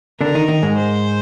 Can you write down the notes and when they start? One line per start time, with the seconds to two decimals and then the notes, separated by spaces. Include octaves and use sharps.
0.21 D3 D4 A#4
0.35 D#3 D#4
0.48 D#3 D#4
0.62 G#2 G#3
0.77 C5